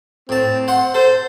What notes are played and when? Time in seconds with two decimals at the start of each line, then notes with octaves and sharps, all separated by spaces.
0.29 A2 C4 A5
0.68 C5 F#5 C6
0.94 A4 C5